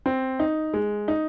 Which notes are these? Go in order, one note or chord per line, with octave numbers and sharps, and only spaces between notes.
C4
D#4
G#3
D#4